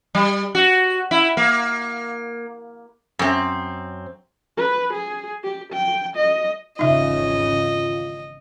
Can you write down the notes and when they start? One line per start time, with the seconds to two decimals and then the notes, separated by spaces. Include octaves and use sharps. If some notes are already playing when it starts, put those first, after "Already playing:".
0.15 G3
0.55 F#4
1.11 E4
1.37 A#3
3.19 F#2 C4
4.57 B4
4.93 G#4
5.43 G4
5.73 G5
6.16 D#5
6.79 G#1 E2 C#3 D#4 F4 D#5 E5